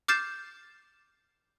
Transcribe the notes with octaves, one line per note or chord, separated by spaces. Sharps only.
D6 F6 G6 A6 C7 E7